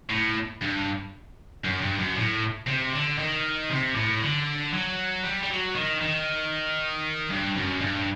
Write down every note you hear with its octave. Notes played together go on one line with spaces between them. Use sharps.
A2
G2
F#2
G2
F#2
A2
C3
D3
D#3
C3
A2
D3
F#3
G3
G3
F#3
D#3
D#3
G2
F#2
G2